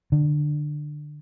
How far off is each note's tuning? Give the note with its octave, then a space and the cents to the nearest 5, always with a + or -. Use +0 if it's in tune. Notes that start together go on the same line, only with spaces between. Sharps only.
D3 +20